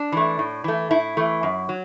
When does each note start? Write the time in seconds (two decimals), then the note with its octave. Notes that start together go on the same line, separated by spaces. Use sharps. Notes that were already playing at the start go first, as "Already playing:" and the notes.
Already playing: D4
0.12 E3 A3
0.39 A2
0.64 E3 A3
0.90 A2 E4
1.17 E3 A3
1.43 F#2
1.69 F#3